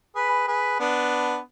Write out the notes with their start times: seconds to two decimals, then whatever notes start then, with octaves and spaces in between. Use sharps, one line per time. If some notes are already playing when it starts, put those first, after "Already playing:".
0.15 G#4 B4
0.47 G#4 B4
0.79 B3 D4